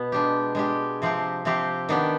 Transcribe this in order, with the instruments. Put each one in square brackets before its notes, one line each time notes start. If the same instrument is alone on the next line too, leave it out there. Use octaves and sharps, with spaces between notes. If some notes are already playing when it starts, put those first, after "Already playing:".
Already playing: [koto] B2 B3
G#3 D4 G4
G#3 D4 G4
C3 F3 C4 G4
C3 F3 C4 G4
D#3 B3 D4 G4